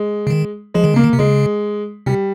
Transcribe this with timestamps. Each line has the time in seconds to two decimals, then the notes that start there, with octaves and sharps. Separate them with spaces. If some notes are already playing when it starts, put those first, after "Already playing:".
Already playing: G#3
0.27 C#3
0.30 D#3
0.74 F3 G#3
0.84 D#3
0.94 C#3 A#3
1.04 D#3
1.13 C3
1.19 C#3 G#3
2.06 C3 G3